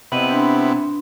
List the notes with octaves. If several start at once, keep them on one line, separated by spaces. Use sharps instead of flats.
C3 B3 E4 D#5 D#7 F#7
D4 C6